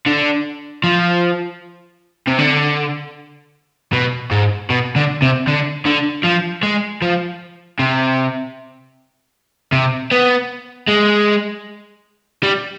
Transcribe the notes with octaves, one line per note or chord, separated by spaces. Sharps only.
D3
F3
C3
D3
B2
G#2
B2
D3
C3
D3
D3
F3
G#3
F3
C3
C3
B3
G#3
G3